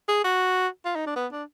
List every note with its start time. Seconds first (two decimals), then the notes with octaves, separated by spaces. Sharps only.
0.09 G#4
0.24 F#4
0.85 F4
0.96 D#4
1.07 D4
1.16 B3
1.32 D4